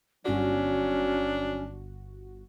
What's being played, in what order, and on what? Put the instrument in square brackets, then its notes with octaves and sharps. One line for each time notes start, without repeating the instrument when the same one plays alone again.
[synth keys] G1 F#4 [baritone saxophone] F#3 [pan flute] C#4 [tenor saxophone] D4